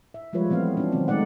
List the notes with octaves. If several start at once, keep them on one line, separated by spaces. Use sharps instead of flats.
E5
F3 G3 G#3 F4 B4 C#5
E3 A3 B3 C4 F5
C#4 D4
B2 D#3 F#3 C4 C#4
G#3 A3 D#4 D5 F#5